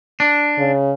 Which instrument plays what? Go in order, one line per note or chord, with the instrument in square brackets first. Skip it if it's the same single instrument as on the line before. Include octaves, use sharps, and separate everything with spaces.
[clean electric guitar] D4
[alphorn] C#3